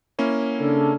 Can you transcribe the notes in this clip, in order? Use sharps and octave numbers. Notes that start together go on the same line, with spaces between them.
A#3 C#4 E4
C#3 D4 A4